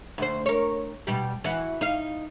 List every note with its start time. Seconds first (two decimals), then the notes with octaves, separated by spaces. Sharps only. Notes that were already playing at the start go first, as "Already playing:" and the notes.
0.18 D2 C5
0.46 A#4 C#5
1.07 B2 G3 G4
1.44 E3 F#4
1.81 D#4 F5